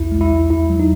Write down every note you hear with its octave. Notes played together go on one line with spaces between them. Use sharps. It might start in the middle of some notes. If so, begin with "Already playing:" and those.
Already playing: B1 E2 E4
G#3
E4
E2
D#2 E4
F#3
D#4